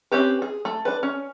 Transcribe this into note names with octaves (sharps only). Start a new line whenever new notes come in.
C4 C#4 G4 B4
G#4
A3
D4 B4
C#4